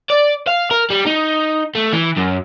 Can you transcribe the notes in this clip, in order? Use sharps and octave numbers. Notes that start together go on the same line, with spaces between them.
D5
F5
A#4
G3
D#4
A3
E3
F#2